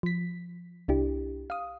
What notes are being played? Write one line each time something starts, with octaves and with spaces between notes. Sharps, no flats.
F3 B6
C2 D4 E4 G4
F5 D#6